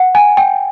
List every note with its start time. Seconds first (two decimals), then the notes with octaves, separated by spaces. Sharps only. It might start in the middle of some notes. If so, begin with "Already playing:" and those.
Already playing: F#5
0.15 G#5
0.37 G5